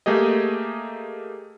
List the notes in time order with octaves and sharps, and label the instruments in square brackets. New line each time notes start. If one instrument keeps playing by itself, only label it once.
[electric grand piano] A3 A#3 G4 G#4 D#5